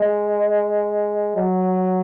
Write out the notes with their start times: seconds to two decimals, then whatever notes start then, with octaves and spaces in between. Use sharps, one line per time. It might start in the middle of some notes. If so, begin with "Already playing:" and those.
Already playing: G#3
1.36 F#3